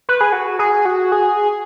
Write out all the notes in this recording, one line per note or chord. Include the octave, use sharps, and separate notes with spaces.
B4
G#4
F#4
G#4
F#4
G#4